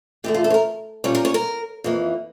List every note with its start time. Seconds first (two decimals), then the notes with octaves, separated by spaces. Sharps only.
0.24 E2 D3 A3 G4
0.34 F4
0.44 A4
0.50 C#5
0.54 A#4
1.04 A#2 G3 C#4 C#5
1.15 A#4
1.25 C#5
1.34 A#4
1.84 F2 E3 A#3